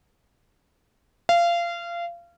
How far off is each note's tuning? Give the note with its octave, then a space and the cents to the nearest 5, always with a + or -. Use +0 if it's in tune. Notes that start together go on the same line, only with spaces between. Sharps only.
F5 -25